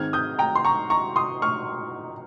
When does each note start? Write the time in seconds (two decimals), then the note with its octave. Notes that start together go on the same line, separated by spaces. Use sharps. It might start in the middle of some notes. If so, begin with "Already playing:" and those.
Already playing: G#2 D#3 G#3 C4 F6 G#6
0.13 D#6 G6
0.39 G5 A#5
0.55 C6
0.65 A#5 C#6
0.90 A#5 C#6
1.16 C6 D#6
1.42 C#6 F6